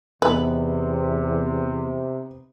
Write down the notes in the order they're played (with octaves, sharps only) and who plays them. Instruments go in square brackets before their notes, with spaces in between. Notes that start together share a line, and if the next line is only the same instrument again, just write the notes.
[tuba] E2 [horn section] C3 [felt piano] B3 D#4 [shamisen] B4